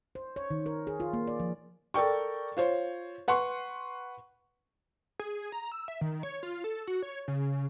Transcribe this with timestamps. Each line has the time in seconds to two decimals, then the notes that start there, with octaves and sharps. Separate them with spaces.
0.15 C5
0.36 C#5
0.51 D#3
0.66 A#4
0.87 G#4
1.00 F4
1.13 A#3
1.27 D5
1.40 F3
1.94 A4 A#4 D5 G5 C#6
2.57 F4 C5 C#5
3.28 B4 F#5 C6 C#6
5.19 G#4
5.52 A#5
5.72 E6
5.88 E5
6.01 D#3
6.23 C#5
6.43 F4
6.64 A4
6.87 F#4
7.02 C#5
7.28 C#3